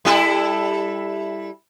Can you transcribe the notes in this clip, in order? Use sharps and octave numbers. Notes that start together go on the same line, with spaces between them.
G3 E4 A4